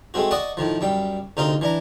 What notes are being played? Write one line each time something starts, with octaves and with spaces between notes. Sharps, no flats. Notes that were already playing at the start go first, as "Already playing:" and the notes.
G#3 A3 C4 F#4
D5 D#5 F#5 A5 C#6 D#6
A2 D#3 F3
F#2 G3 G5
D2 C3 D#4 A#4 F5 C6
E3 D4 A#5